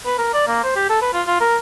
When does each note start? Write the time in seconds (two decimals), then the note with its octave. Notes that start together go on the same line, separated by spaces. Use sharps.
0.06 B4
0.18 A#4
0.34 D5
0.47 A#3
0.63 C5
0.76 G4
0.89 A4
1.02 B4
1.13 F4
1.27 F4
1.41 A#4